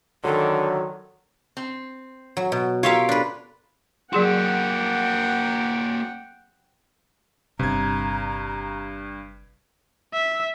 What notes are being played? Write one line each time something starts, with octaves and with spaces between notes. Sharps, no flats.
D3 D#3 F#3 A4
C4
F#3
B2
F4 G4 A#4 C#5 E5 F5
D4 B4
F#3 A#3 F#4 G#4 F#5 G5 C6
G1 G2 C3 A#5 G#6
E5